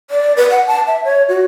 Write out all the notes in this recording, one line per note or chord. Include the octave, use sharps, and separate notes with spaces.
D5
B4
F#5
A5
E5
C#5
F#4